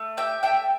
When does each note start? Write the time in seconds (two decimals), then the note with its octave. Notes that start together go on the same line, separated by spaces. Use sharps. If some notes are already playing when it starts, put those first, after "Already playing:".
Already playing: A3
0.17 G4 E5 G5
0.43 A3 E5 G5